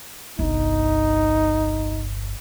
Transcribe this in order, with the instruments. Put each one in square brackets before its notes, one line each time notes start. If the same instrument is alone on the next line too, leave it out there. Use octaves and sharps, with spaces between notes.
[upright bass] G1 C2 [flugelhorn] D#4